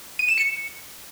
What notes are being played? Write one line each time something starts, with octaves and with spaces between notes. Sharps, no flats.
D#7
E7
C#7